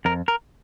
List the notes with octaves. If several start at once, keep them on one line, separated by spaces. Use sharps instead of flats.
F2 A#4
A#4